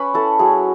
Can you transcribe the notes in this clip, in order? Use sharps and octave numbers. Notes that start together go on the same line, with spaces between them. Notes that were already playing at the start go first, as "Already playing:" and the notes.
Already playing: C#4 B4 B5 C#6
E4 A4 A5
F#3 G#4 G#5